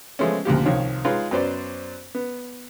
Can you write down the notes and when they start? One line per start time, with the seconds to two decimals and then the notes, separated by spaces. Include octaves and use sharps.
0.19 F3 G#3 A3 B3 C#4
0.45 D2 A#2 F3 G4
0.65 C2 D#3 F3 C#5 F5
1.05 G#3 D#4 F4 B4 C#5
1.31 F#2 B3 C#4 C5 D5
2.15 B3